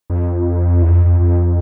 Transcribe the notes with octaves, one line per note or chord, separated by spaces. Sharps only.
F2
E2
F2
F2
F2